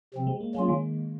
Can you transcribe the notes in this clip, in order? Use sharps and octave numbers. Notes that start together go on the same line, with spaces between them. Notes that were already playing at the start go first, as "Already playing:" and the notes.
C3 F3 C4
G#3
A#3
F#3 G#3 A#3 C#4 F4
D#3